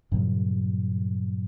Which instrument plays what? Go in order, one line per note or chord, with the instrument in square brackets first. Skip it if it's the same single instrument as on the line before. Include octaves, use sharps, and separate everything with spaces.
[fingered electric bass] G2 A#2 C#3 F#3